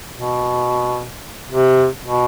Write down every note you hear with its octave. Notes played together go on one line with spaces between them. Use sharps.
B2
C3
B2